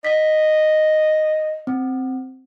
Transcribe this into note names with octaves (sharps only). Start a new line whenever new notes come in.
D#5 B6
C4